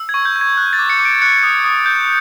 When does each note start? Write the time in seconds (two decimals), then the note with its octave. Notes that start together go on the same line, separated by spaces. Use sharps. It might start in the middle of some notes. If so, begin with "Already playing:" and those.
Already playing: E6
0.09 G#6
0.14 C#6
0.25 G6
0.36 G6
0.41 G#6
0.57 F#6
0.73 A6
0.79 D6
0.90 C#7
1.00 D6
1.05 D7
1.22 F#6 C#7
1.43 D#6
1.65 D#6
1.86 G6